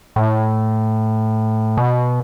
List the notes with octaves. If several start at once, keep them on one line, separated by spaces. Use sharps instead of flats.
A2
B2